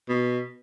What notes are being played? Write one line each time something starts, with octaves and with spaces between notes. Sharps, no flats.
B2